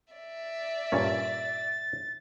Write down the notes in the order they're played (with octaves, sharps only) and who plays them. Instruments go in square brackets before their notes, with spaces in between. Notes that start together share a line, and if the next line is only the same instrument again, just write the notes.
[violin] D5 E5
[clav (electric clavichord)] G2 A#2 C#4 [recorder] A6